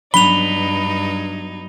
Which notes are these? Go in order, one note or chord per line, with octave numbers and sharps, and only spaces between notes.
G2 F#3 B3 D4 D#4 B5 F7 G7